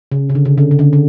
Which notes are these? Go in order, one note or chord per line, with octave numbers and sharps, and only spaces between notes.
C#3
C#3
D3
C#3
D3
C#3
D3
D3